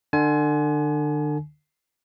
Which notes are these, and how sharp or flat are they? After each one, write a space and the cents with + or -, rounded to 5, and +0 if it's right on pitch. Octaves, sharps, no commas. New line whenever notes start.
D3 +30 G#5 +35